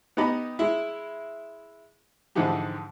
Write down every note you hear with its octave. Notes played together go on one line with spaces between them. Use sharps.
B3 D#4 G4 D#5 A#5 B5
G#3 E4
G#2 D3 E3 F3 D#4 G4